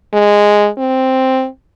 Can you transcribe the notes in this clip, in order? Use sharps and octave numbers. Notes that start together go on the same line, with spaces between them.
G#3
C4